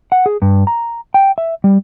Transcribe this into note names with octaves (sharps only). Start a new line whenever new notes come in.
F#5
G#4
G2
A#5
G5
E5
G3